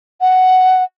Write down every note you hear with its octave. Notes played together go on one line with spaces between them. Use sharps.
F#5